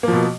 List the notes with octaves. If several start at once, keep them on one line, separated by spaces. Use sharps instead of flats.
B2 F3 A#3